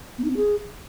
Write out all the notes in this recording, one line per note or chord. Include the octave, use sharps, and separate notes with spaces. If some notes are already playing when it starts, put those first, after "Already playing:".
B3
D#4
C4
G#4